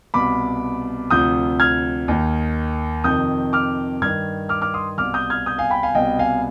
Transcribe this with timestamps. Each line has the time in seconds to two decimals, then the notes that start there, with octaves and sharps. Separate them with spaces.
0.14 C2 B2 B5 D6
1.10 D2 C3 F3 D#6 G6
1.60 F6 G#6
2.08 D#2 D#3
3.04 F2 C3 D#3 D#6 G6
3.53 D6 F6
4.01 G2 D#3 F6 G#6
4.49 D6 F6
4.62 D6 F6
4.74 C6 D#6
4.98 C2 B2 D6 F6
5.14 D#6 G6
5.30 F6 G#6
5.46 D#6 G6
5.58 F5 G#5
5.70 G5 B5
5.83 F5 G#5
5.95 C2 B2 D#5 G5
6.19 F5 G#5